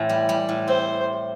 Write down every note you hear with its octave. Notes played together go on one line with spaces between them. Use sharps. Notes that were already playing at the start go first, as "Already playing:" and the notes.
Already playing: A2 E3 C4
G3
G3
A2
C4 C5